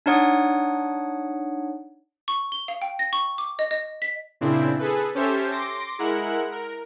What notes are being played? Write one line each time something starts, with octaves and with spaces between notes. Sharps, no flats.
D4 D#4 C#5 F#5 D#6
C#6
G7
F5
G5
A#6
C#6
D6
D#5
D#5
B6
A#2 C#3 C4 D4 E4
G#4 A4 B4
C#4 G4 A4 C5 C#5 E5
C6 D6 A#6
G#3 E4 A#4 F#5 F#6
A#4